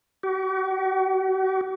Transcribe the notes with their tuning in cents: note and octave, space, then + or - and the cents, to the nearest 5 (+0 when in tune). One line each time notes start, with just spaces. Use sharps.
F#4 +45